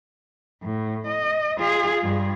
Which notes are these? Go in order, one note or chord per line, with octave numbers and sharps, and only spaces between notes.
A2
D#5
F4 G#4
G2